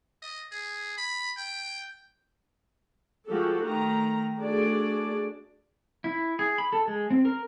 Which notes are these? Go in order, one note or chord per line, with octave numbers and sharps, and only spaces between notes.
D#5
G#4
B5
G5
F3 G#3 F#4 G4 A4
D#3 A3 A#5
A3 D4 F#4 G#4 D5
E4
G#4
B5
A4
G#3
C4
A#4